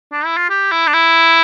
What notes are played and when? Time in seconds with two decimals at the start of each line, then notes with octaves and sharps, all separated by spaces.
0.12 D4
0.25 E4
0.37 F4
0.50 G4
0.72 E4
0.87 D4
0.94 E4